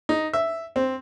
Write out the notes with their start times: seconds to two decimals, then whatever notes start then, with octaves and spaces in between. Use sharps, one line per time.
0.09 D#4
0.33 E5
0.76 C4